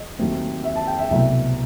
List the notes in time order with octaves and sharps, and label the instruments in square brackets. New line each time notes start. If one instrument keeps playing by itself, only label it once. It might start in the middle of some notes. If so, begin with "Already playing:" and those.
Already playing: [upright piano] D#5
D#2 D#3 F#3 A3 C4
E5
A5
G5
E5
C2 B2 F#3 A3 E5